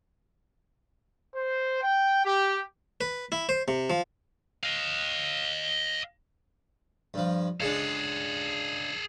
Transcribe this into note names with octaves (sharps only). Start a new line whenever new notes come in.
C5
G5
G4
B4
E4
C5
C3
F3
D#5 F5
G2 F3
C#2 G#3 D4 G#4 A4